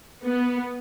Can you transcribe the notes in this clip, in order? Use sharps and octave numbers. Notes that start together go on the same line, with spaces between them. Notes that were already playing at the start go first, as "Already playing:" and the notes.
B3